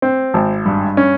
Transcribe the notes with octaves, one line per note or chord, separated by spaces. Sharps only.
C4
G#1
G2
C#4